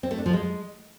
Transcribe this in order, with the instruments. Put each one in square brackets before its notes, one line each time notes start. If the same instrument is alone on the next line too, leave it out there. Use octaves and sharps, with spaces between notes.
[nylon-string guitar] C4
A3
D4
F3
G#3